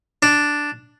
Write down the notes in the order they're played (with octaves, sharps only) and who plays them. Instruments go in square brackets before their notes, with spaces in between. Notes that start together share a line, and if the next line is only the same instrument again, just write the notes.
[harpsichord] D4